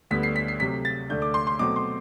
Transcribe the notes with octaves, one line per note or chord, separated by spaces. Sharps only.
D2 D3 G3 B3 B6
C7
B6
C7
C3 F#3 A3 B6
A6
D2 D3 A3 D4 G6
D6
C6
C6
B2 F#3 A3 C4 D6
C6